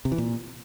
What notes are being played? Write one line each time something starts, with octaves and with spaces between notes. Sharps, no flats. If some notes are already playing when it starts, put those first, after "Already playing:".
C3
E3
A#2